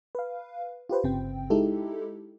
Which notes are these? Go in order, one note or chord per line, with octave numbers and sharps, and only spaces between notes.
B4 F5
F4 G4 B4 C5
G1 C#3 C4 G5
G#3 D#4 E4 G4 A4